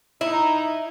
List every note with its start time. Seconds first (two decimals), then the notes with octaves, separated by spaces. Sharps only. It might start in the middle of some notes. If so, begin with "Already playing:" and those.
0.21 D#4 E4